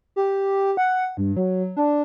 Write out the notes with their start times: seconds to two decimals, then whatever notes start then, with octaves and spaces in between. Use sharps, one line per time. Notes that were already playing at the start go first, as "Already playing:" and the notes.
0.16 G4
0.77 F#5
1.17 G2
1.37 F#3
1.77 D4